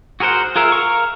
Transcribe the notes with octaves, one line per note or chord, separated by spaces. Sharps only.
F#4 G#4 A#4 C5 F#5
F4 G#4 A#4 E5 F5
A#4 F5 C#6